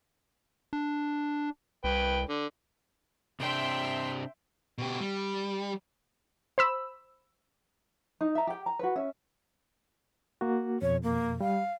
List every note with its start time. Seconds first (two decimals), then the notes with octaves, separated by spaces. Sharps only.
0.73 D4
1.84 C2 B4 G5
2.29 D3
3.40 C3 C4 D4 E5 G5 C6
4.78 B2 G4
5.01 G3
6.58 C5 B5 E6
8.21 D#4
8.35 E5 A#5
8.47 G4 G5
8.66 A#5
8.79 F#4 B4
8.96 C#4 E5
10.41 A#3 F#4
10.82 F2 B2 C#5
11.03 A#3
11.41 G3 F5